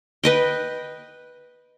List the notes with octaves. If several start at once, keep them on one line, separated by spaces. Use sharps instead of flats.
B4 D#5 G5